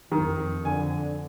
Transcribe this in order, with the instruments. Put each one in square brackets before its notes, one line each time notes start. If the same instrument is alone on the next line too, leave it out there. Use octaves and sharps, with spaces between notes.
[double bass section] F2 [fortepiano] D#3
[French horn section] D3 [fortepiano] G#5